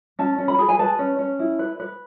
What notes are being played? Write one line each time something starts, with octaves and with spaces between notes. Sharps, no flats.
C#4 A5
C#4
B5
G#4
G#5
B4 A5
C#4
C#4
E4
B4
B4